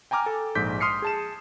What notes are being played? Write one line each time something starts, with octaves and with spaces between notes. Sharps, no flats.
G5 G#5 A#5 D6 F6
A4
A#1 G#2 D6 G6 B6
C6 D#6 F6 C7 C#7
G#4 A5 E7